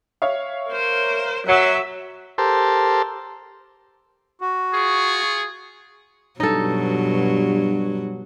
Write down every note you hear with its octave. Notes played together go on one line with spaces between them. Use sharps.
C#5 E5 F5
A#4 C5
F#3 E5 F#6 E7
G4 A4 A#4 C5 A5 C6
F#4
F4 G#4 C#6
G2 B2 F#3 D#4 A4